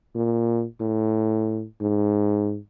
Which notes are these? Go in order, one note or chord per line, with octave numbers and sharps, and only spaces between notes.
A#2
A2
G#2